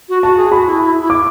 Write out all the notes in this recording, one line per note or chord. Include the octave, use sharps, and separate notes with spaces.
F#4
F#4 A5
G#4
F#4 B5
E4
E4
E4
D6